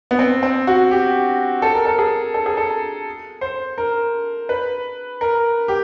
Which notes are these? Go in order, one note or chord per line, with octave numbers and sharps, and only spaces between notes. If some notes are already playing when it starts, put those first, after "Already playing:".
B3
C4
C4
F#4
G4
A4
A#4
A4
G#4
A4
G#4
A4
C5
A#4
B4
A#4
G4